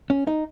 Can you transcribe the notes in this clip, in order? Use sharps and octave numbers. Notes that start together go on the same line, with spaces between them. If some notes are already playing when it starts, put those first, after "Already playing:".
C#4
D#4